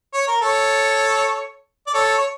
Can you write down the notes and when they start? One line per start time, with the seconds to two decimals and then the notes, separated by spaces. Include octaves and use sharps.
0.14 C#5
0.28 A#4
0.41 A4 C#5
1.87 D5
1.94 A4 C#5
2.18 C#5